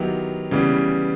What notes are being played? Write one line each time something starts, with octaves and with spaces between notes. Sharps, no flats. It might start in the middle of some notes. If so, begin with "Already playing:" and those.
Already playing: D#3 F#3 B3 E4 G4
C#3 E3 G3 B3